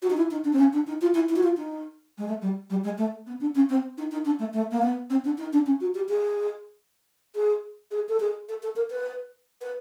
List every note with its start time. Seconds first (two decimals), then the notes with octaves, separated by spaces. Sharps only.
0.02 F#4
0.10 D#4
0.17 E4
0.31 D#4
0.45 D4
0.53 C4
0.59 C#4
0.73 D4
0.87 D#4
1.01 F4
1.14 E4
1.29 E4
1.36 F#4
1.43 F4
1.57 D#4
2.18 G#3
2.28 A3
2.42 G3
2.70 G3
2.84 G#3
2.98 A3
3.27 B3
3.41 D4
3.55 C#4
3.69 C4
3.98 D#4
4.12 D#4
4.25 D4
4.39 A3
4.54 A3
4.71 A#3
4.82 B3
5.10 C4
5.25 D4
5.38 D#4
5.53 D4
5.66 C#4
5.81 F#4
5.95 G4
6.09 G#4
7.35 G#4
7.91 G#4
8.09 A4
8.20 G#4
8.49 A4
8.63 A4
8.76 A#4
8.90 B4
9.61 B4